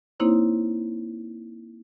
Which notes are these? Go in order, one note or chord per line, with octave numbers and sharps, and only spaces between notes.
A#3 C4 D#4 E4 C5 C#5